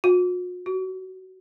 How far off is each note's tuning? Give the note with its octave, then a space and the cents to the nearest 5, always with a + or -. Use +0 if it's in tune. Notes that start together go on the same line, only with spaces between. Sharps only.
F#4 -45
F#4 +25